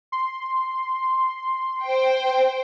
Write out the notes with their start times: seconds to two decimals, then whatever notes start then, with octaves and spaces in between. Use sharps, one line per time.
0.12 C6
1.84 C5 G5